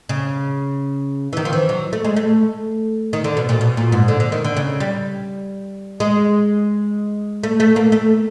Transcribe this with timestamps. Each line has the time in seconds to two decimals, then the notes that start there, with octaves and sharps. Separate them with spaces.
0.09 C#3
1.33 E3
1.37 D#3
1.45 F3
1.53 E3
1.69 F#3
1.93 A3
2.05 G#3
2.16 A3
3.13 D#3
3.24 D3
3.37 B2
3.49 A#2
3.61 B2
3.77 A#2
3.92 G#2
4.08 D3
4.20 D3
4.32 D#3
4.44 D3
4.57 C#3
4.80 G3
6.00 G#3
7.43 A3
7.60 A3
7.76 A#3
7.92 A3